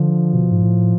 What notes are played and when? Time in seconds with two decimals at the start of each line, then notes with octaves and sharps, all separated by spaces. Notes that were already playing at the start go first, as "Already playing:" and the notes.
Already playing: D3 F3
0.34 B2
0.52 G#2
0.63 A2